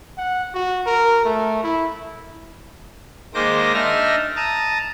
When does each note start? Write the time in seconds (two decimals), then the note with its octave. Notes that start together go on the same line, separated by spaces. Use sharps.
0.18 F#5
0.54 F#4
0.86 A#4
1.25 A3
1.64 E4
3.34 D#3 G#3 A#3 C5 D6 A#6
3.74 D4 D#4 E5 F6 A#6
4.36 A5 A#5 D#6